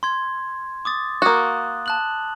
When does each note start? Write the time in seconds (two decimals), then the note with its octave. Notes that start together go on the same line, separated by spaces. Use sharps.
0.03 C6 G#6
0.85 D6 D#6 A6
1.22 A#3 F#4 D#6 F#6
1.86 A5 F#6 F#7